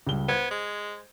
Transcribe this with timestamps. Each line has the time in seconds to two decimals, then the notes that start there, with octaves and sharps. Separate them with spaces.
0.07 C#2 G3 G7
0.28 B3 C5 G#6
0.51 G#3